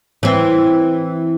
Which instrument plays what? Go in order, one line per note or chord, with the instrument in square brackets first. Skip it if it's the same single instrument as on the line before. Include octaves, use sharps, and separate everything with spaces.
[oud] E3 C4